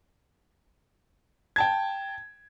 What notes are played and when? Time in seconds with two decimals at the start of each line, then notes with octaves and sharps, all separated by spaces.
1.56 G5 A5 G#6